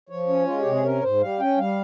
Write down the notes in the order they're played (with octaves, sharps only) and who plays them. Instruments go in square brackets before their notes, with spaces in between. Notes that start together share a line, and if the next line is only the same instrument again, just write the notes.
[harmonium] F3 C#5
C#4
G#3 F4
G4
C3
G#4
C#4 A#4
G#2 C5
G3 F5
C#4 G5
G3 F5